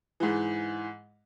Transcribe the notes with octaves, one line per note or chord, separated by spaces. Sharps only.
G#2 E3